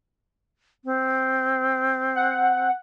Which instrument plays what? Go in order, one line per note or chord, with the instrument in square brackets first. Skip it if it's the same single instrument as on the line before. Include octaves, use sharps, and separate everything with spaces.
[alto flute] C4
[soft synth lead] F#5